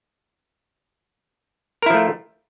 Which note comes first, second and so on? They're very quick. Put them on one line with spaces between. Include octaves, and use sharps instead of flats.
A#4 E4 F3 A3